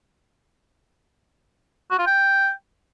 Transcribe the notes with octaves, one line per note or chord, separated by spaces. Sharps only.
F#4
F4
G5